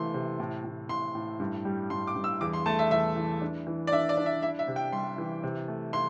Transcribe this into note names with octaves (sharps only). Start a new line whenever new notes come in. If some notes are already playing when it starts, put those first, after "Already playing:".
Already playing: C3 E3 A3 C6
C3
A2
A2
A2 C6
A2
G2
G3
G2 C6
D6
G2
E6
E2 D6
C6
A3 A5
E5
E2 E5
E3
D4
E3
D5
D4 E5
D5
D4
E5
E4 E5
E5
C3
G5
G3 C6
E3
C3
A3
E4 C6